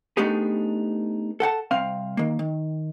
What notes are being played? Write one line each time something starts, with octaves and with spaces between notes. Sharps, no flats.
A3 B3 D4 D#4 G4 G#4
A4 F#5 G5 A5
C2 C4 F5
D#3 A#3
D#3